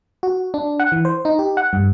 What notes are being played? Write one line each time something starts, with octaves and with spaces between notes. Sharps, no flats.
F#4
D4
F#5
E3
C5
D#4
G4
F#5
G2